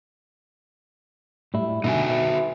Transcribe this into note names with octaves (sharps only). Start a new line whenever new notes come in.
A2 G3 E4
B2 D3 D#4 F#4 E5 G#5
B4 E5